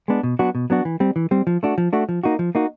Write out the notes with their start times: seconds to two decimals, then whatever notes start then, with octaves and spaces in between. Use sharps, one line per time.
0.08 G#3 B3 D4
0.23 B2
0.39 F#3 B3 D4 F#4
0.55 B2
0.70 F#3 B3 D4 F#4
0.85 E3
1.00 G3 C4
1.16 E3
1.31 G3 C4
1.47 F3
1.63 A3 D4 F#4
1.78 F3
1.93 A3 D4 F#4
2.09 F3
2.24 A#3 D#4 F#4
2.39 F3
2.55 A#3 D#4 F#4